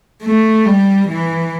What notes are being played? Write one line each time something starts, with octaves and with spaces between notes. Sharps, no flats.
A3
G3
E3